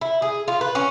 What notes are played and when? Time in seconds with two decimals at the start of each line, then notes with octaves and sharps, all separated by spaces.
0.01 E4
0.22 G#4
0.48 F4
0.61 B4
0.75 C#4